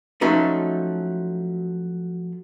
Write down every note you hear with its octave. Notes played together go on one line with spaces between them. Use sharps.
F3 F#3 A3 C#4 D#4